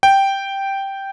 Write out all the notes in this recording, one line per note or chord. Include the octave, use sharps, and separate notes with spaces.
G5